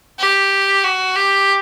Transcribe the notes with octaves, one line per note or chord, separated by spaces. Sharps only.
G4
F#4
G4